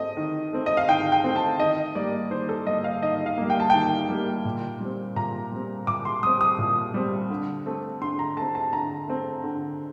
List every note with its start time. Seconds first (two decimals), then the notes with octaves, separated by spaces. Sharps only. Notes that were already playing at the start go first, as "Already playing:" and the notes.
Already playing: A3 C4 D#5
0.17 D#3
0.53 A3 C4
0.66 D#5
0.77 F5
0.89 D#3 G5
1.12 G5
1.24 A3 C4
1.36 A5
1.60 D#3 D#5
1.95 G3 A#3 D5
2.31 D#3 C5
2.49 A4
2.67 G3 A#3 D#5
2.84 F5
3.02 D#3 D#5
3.26 F5
3.38 G3 A#3
3.50 G5
3.60 A5
3.70 D#3 G5
4.09 G3 A#3
4.45 A#2
4.80 G3 C4
5.16 A#2 A#5
5.52 G3 C4
5.87 A#2 D6
6.05 C6
6.23 G3 C4 D#6
6.41 D#6
6.58 A#2
6.94 G3 C4
7.30 D3
7.66 A3 C4
8.02 D3 C6
8.19 A#5
8.37 A3 C4 A5
8.55 A5
8.73 D3 A#5
9.08 A3 C4
9.44 D3